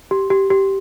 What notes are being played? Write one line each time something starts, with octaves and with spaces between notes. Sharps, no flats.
G4
G4
G4